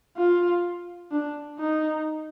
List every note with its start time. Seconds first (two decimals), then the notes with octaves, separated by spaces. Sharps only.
0.17 F4
1.11 D4
1.59 D#4